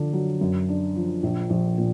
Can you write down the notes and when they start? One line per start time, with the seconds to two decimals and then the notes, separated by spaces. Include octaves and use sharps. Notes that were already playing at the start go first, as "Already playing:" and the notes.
Already playing: D3 F3 D4
0.13 F#3
0.41 F#2
0.69 D4
0.96 F3
1.23 A#1
1.50 A#1
1.78 A#2